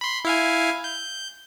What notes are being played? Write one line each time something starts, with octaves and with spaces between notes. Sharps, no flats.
B5 C6
E4 F5 G#5
G6